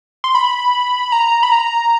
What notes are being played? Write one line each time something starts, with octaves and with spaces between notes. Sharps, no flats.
C6
B5
A#5
B5
A#5